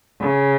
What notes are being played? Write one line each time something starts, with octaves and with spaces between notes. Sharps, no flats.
C#3